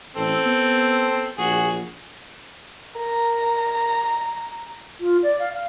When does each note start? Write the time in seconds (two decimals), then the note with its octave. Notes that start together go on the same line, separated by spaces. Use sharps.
0.16 A1 C4 A4
0.45 B3
1.38 A#1 F#4 G#4
2.97 A#4 A#5
5.00 F4
5.23 D5
5.39 F5
5.53 F5